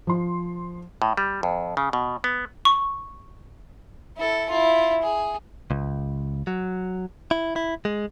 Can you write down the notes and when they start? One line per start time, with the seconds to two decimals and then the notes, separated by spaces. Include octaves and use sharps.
0.07 F3 C6
1.02 A2
1.17 G3
1.43 F2
1.77 C#3
1.93 B2
2.24 B3
2.65 C#6
4.17 E4 A4
4.49 E4 F4
5.02 G#4
5.71 C#2
6.47 F#3
7.31 E4
7.56 E4
7.85 G#3